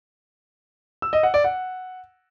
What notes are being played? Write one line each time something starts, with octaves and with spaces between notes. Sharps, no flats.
E6
D#5
F#5
D5
F#5